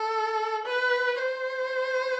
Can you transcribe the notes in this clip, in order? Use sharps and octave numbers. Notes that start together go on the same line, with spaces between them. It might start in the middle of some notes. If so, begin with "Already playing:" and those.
Already playing: A4
B4
C5